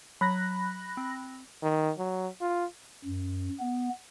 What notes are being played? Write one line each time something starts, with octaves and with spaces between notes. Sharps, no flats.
F#3 B5 F#6 A#6
C4
D#3
F#3
F4
F#2
B3